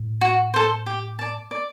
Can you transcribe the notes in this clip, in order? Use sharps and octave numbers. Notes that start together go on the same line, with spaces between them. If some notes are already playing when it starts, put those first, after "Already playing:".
Already playing: A2
F#4
A4 C5
G4
D5 A5
D5